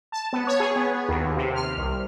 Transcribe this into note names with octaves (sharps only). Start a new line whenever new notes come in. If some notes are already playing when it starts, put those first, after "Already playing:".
A5
B3
C#5
G#4
B3
D#2
C3
F6
C2